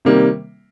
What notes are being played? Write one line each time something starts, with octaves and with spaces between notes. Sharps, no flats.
C3 D#3 G3 A#3